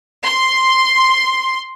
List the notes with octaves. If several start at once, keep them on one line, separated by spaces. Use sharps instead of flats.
C6